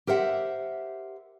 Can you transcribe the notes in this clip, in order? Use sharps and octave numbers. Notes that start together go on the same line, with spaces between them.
G4 A#4 C5 E5 F#5